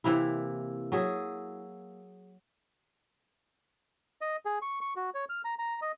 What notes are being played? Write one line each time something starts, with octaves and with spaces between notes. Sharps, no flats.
C3 E3 A#3 E4
F#3 G#4 E5
D#5
G#4
C#6
C#6
F#4
C#5
F6
A#5
A#5
D#5